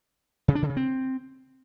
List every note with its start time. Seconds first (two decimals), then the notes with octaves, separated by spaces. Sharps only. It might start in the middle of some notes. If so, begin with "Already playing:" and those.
0.48 C#3
0.55 D4
0.62 D3
0.69 C#3
0.77 C4